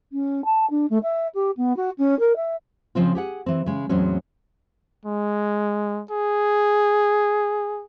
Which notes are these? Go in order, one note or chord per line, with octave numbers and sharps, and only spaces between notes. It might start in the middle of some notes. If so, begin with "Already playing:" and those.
C#4
A5
D4
A3
E5
G4
B3
F#4
C#4
A#4
E5
C#3 F3 C4 F4
G4 G#4 F#5
E3 C4
C#3 G#3
E2 A2 F#3 G#3 C4 C#4
G#3
G#4